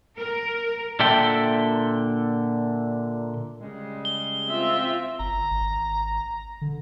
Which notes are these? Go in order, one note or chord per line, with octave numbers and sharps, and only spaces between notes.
A#4
A#2 D3 A4 E5 G5
C#3 G3 G#3
G7
C4 F4 E5
G1 A#5
G#1
D3